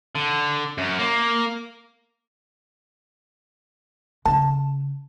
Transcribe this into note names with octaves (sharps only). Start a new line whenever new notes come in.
D3
F#2
A#3
C#3 A5